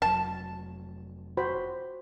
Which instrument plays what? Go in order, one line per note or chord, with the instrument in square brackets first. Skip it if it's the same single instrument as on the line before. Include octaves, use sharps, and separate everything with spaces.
[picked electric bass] F1 F#3 [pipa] A5
[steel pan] F#4 C5 B5